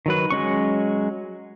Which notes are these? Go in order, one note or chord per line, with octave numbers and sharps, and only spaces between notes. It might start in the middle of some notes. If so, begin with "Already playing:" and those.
D#3 F#3 B4
F#3 G#3 C#4 C#6